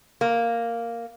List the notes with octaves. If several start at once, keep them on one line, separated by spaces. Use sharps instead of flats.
A#3